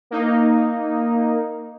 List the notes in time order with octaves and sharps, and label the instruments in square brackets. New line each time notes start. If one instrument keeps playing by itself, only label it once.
[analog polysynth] A#3 D#4